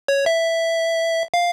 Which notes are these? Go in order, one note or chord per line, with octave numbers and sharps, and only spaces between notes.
C#5
E5
F5